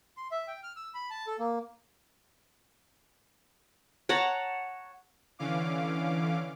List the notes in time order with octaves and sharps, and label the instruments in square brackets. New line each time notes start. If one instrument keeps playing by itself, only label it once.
[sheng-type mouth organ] C6
E5
G5
F6
E6
B5
A5
A4
A#3
[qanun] C#5 F#5 A5 A#5
[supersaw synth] D3 E3 C#4 F5 D6